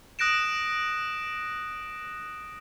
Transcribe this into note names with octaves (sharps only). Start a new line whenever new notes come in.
D#6 F#6 A#6 D7 E7